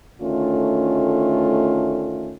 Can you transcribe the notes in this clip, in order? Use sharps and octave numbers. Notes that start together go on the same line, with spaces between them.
D2 D#3 A3 C#4 F4